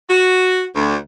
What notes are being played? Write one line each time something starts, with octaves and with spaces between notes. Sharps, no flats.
F#4
D2